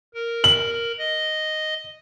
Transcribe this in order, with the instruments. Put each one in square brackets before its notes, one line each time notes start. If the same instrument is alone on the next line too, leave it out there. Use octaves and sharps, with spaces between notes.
[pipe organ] A#4
[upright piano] F#7
[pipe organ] D#5